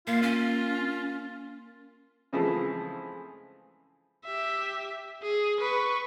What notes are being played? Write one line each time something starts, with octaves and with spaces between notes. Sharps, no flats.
A#3 F4 F5
C#4
C#3 E3 F3 G#3 A3 C4
G4 E5
G#4
B4 C#6